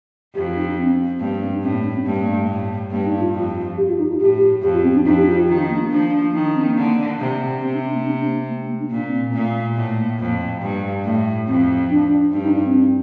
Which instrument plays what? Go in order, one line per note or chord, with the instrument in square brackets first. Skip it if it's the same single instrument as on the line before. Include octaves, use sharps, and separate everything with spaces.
[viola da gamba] F2 [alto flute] G4
[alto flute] F4
D#4
D4
C4
[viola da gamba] G2 [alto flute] A#3
[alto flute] A#3
C4
D4
[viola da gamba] A2 [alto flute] C4
[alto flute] A#3
D4
C4
[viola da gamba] G2 [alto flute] A#3
[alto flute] A#3
A3
[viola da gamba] A2
[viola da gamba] G2 [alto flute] A#3
[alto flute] D#4
F4
[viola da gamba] F2
[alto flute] G4
F4
D#4
F4
[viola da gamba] A2 [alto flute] G4
[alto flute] G4
[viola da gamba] F2 [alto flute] G4
[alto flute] F4
C4
D4
[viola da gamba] F2 [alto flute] D#4
[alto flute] G4
F4
F4
[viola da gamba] D#3 [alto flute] F4
[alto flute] D4
A#3
A#3
[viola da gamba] F3 [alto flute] D4
[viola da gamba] D#3 [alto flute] D#4
[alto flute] D4
C4
A#3
[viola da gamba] D3
C3
[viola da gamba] C3 [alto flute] C4
[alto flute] D4
C4
A#3
D4
A#3
A3
A#3
D4
[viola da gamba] A#2 [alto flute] A#3
[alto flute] C4
A#3
[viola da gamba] A#2 [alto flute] A3
[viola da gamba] A2 [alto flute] A#3
[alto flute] A#3
[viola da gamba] F2
G2
[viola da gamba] A2 [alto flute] A3
[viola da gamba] F2 [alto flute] C4
[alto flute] D4
[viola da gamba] G2 [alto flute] D4
[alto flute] D#4
D4
C4